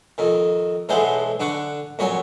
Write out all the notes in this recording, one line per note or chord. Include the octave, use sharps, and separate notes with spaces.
F2 D#3
B1 E3 G#3 A4 C5 F#5
D3 D4 F#5 C#6
F2 A#2 F#3 C#5 G#5